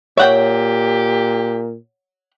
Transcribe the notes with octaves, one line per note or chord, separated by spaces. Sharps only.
A#2 G4 C#5 E5 F#5 G5